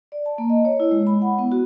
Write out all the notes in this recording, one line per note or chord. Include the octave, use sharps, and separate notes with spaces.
D5
A5
A#3
D#5
C#5
E4
G#3
B5
F#5
B3
F#4